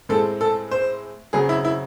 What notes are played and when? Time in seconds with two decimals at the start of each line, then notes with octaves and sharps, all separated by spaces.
0.09 A2 G#3 C4 A4
0.41 A4
0.71 C5
1.33 C#3 F#3 C4 G#4
1.49 E4
1.65 E4